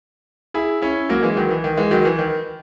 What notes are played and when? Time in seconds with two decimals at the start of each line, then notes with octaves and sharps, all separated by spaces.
0.54 E4 G#4
0.82 C#4 E4
1.09 F#3 A#3
1.23 E3 G#3
1.37 D#3 F#3
1.51 E3
1.64 D#3
1.77 E3 G#3
1.91 D#3 F#3
2.05 E3
2.19 D#3